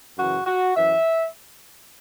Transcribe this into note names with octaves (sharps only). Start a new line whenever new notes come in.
F#2 C#3 E3 F#4
F#4
F#2 E3 E5